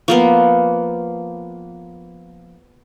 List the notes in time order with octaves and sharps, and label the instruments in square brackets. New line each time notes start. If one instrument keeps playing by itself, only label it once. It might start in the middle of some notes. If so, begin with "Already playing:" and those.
[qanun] F3 A#3 B3